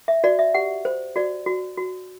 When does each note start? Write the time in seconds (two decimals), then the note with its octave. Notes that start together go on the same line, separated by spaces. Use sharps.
0.08 E5
0.24 F#4 D5
0.39 E5
0.54 G4 F#5
0.85 C5
1.16 F#4 D5
1.46 F#4
1.78 F#4